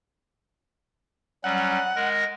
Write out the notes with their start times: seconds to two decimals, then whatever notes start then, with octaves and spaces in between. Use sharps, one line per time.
1.44 F#3 G3 C#4 F#5
1.96 G#3 A#4 A#6